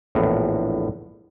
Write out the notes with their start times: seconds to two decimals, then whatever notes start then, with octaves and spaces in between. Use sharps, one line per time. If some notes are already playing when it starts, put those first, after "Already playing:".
0.15 A#1 E2 A2